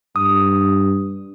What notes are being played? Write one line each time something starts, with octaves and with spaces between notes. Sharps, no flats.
G2 D#6